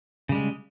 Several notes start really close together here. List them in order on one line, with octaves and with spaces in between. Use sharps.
C#3 G3 G#3